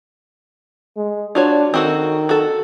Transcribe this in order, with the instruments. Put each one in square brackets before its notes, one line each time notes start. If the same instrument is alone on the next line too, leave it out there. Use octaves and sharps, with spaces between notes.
[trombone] G#3
[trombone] D4 [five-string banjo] F4 F#4 C#5
[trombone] D#3 [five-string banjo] C4 F#4 A4
[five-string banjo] F#4 A4